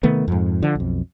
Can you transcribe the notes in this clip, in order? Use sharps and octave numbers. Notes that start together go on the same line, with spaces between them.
C3 D#3 A3 B3
F2 G#2
D3 F3
B1 F2